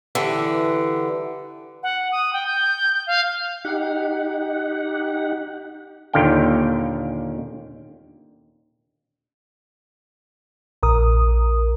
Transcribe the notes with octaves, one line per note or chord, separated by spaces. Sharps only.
D3 E3 G3
F#5
D#6
G5
G6
F5
D#4 G4 F#5
D#2 A#2 D3 F5 G5
A#1 A#4 D#6